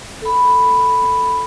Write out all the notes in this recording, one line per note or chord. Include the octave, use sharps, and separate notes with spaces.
A4 B5